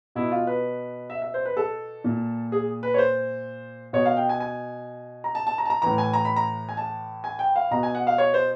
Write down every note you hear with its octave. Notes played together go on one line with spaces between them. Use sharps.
B2 E4
F4
B4
E5
E5
C5
B4
A4
A#2
G#4
B4
C#5
C5
B2 C#5
F5
G5
G#5
G#5
A#5
A5
A5
A#5
A5
A#5
A2 E3 A#5
G#5
A#5
B5
A#5
G#5
A5
G#5
G5
F5
B2 A#5
G#5
F#5
F5
C#5
C5